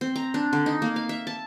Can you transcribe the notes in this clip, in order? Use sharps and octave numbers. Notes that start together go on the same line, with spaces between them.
C4
A#5
D4
D3
D#4
A#3
F5
E5
A5